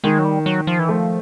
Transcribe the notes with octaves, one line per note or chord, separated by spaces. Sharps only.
D#3 G#3
F#3
G3
F#3
F3
E3
F3 A3